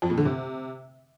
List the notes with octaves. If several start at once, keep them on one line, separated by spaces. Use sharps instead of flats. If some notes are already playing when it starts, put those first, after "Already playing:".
F2
A#2
D3
C3